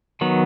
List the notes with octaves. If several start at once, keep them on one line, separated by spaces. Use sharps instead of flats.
D#3 F#3 B3